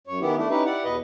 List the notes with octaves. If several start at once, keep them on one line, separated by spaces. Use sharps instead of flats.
F#2 C#5
D#3 E3 B3 E4 G4
A3 D4 E4
C#4 D#4 E4 G4 B4
E4 G4 D5 F#5
E2 B2 B4 D#5